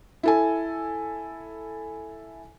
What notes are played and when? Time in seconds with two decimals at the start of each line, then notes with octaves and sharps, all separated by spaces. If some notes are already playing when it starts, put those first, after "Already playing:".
0.23 E4 A4 G#5